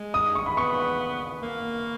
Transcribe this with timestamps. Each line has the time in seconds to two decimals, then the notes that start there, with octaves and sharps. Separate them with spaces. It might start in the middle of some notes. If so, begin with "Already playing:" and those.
Already playing: G#3
0.14 D#6
0.35 C#6
0.46 B5
0.57 B3 C#6
1.42 A#3